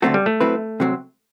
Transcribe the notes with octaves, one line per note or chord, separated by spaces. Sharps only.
D3 F#3 A3 C4 F#4 A4
G3
A3
F#3 C4 E4 B4
C3 F#3 C4